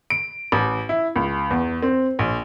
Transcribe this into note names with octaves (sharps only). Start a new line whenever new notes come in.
D7
A1
E4
C#2
E2
C4
A#1